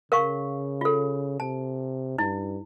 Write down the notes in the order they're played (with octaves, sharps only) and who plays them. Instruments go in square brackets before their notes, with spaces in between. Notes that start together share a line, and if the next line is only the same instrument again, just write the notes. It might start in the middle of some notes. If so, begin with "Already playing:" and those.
[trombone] C#3 [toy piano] A#4 F5 C#6
[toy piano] F4 A4
[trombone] C3 [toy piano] A5
[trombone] G2 [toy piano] D#4 E4